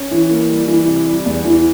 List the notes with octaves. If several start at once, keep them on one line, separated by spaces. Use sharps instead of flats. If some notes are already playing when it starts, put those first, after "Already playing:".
Already playing: C#4
E3
A#3
G3
E3
C3
G3
E2
E3